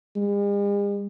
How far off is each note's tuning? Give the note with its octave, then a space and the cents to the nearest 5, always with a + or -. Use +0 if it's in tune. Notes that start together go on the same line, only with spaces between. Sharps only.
G#3 -45